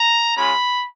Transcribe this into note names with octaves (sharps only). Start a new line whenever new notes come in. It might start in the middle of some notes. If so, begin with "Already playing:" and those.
Already playing: A#5
G#3 C#4 F4 B5